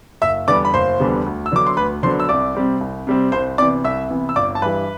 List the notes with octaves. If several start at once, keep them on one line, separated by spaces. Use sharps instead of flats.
F#1 E5 E6
E2 D3 G3 B3 D5 D6
B5
F#1 C5 C6
E2 D3 G3 B3
D2
E6
D3 F#3 B3 D4 D6
C6
D2 B4 B5
D3 F#3 B3 D4 C5 C6
E6
C2 D5 D6
C3 G3 C4
C2
C3 G3 C4
C2 C5 C6
C3 E3 B3 D5 D6
C2 E5 E6
C3 E3 B3
E6
G1 D5 D6
A5
G2 E3 G3 B4 B5